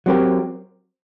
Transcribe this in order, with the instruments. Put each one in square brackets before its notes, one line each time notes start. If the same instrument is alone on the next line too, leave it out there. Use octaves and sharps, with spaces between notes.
[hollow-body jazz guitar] F#3 C4 G4 A#4